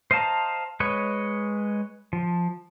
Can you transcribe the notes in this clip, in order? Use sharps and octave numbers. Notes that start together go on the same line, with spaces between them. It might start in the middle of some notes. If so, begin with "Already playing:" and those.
C5 D#5 F5 A5 A#5
G#3 B4 C#5 D#5
F3